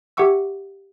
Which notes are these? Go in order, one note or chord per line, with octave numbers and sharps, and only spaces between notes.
G4 E5 F#5 C#6 E6